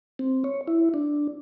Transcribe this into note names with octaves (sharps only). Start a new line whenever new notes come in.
C4
C#5
E4
D4